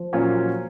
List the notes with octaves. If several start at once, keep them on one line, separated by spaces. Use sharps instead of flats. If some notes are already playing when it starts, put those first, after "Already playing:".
Already playing: F3
A#2 F#3 C#4 F4